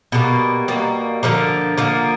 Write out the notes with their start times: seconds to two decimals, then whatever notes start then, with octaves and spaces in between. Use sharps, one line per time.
0.12 B2 G3 A#3
0.68 B2 G3 A#3
1.23 D3 F3 A#3
1.78 D3 F3 A#3